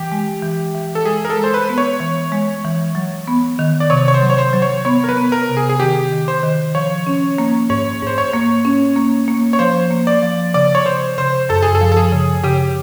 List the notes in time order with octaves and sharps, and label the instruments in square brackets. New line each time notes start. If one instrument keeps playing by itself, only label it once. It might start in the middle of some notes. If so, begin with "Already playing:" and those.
Already playing: [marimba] E3 [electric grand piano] G4
[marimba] G#3
E3
E3
[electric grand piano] A4
[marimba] G#3 [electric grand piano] G#4
[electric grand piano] A#4
A4
[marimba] G#3
[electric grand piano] C5
B4
[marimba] B3
[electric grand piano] C#5
[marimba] E3
G#3
E3
F#3
B3
D#3
[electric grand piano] D5
[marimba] C3 [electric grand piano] C#5
[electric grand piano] C#5
C5
[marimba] F#3
[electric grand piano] C#5
C5
[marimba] F#3
[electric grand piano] C#5
[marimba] B3 [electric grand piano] C#5
[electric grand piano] A#4
B4
[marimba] B3
[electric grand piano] A#4
[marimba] C3
[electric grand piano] G#4
G#4
[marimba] D#3 [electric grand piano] G4
[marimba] D#3
[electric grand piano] C5
[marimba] D#3
[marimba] F3 [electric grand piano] C#5
[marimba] C#4
A#3
[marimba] G#2 [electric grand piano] C#5
[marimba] G#2 [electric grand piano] C5
[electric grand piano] C#5
[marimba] A#3
C#4
A#3
A#3
[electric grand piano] C#5
[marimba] F3 [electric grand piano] C5
[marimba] A#3
[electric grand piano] D5
[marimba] F3
[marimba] C#3 [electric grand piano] D5
[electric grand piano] C#5
[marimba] C#3 [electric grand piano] C5
[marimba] C#3 [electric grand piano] C5
[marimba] F#2 [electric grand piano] A4
[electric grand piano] G#4
A4
[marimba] F3
[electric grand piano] A4
G#4
[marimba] C#3
[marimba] C#3 [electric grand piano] G4